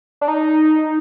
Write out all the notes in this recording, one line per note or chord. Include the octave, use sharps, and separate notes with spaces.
D4
D#4